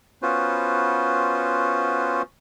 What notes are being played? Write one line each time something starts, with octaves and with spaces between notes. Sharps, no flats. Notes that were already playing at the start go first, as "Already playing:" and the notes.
B3 C#4 F4 F#4 B4 C5